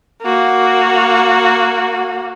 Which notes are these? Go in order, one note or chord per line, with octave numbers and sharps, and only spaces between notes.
A#3 F#4